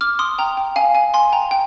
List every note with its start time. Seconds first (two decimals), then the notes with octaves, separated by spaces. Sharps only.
0.01 D6 F6
0.19 C6 D#6
0.38 G5 A#5
0.57 G5
0.76 F5 G#5
0.95 F5 G#5
1.14 G#5 C6
1.32 G5 A#5
1.51 G5